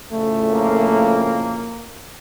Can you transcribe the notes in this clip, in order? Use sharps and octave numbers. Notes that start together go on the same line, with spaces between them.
F2 A2 C#3 A3
A#3